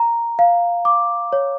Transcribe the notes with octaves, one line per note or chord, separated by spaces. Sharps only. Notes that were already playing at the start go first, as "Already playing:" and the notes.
Already playing: A#5
F5
D6
C#5